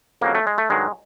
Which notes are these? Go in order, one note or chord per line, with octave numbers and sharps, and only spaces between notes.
F2 C#3 F#3 A#3
A3
G#3
A3
G2 D#3 F#3 G#3